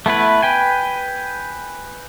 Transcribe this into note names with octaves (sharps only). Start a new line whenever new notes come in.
A3 B3 E4 B4
B4 G5 G#5